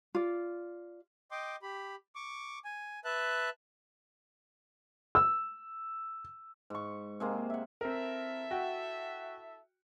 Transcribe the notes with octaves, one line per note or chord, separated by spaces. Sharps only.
F4 D5
D#5 G5 C6 D6
G4 B5
C#6 D6
G#5
B4 E5 A5 F#6
E6
G#2 C#6
C3 G#3 A#3
E5 F#5
C4 E4 A4 A#4 E5
F#4 G5